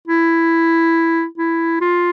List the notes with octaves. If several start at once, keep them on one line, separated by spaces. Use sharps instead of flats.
E4
E4
F4